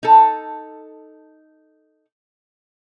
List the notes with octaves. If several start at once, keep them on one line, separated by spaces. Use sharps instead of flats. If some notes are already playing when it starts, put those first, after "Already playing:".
D#4 A4